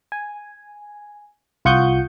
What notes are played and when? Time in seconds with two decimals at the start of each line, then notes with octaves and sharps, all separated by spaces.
0.12 G#5
1.65 C2 F4 F#5 C#6 D#6 G6